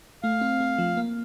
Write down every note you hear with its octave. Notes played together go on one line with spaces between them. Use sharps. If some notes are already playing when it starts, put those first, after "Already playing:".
A3 F5
C4
A3
F3
A#3